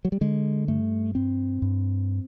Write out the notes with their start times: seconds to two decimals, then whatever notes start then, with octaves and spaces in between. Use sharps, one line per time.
0.05 F#3
0.12 G3
0.21 D3 G#3
0.68 G2 A3
1.15 G2 C4
1.62 G2